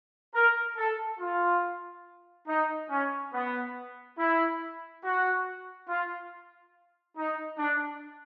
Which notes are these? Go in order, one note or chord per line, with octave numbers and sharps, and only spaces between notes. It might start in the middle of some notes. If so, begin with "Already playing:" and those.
A#4
A4
F4
D#4
C#4
B3
E4
F#4
F4
D#4
D4